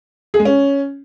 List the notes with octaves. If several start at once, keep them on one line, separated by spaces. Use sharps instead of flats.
G#4
G#3
C#4